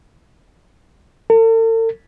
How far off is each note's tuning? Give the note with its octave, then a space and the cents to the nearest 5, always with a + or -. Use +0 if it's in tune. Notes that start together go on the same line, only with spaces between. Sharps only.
A4 +45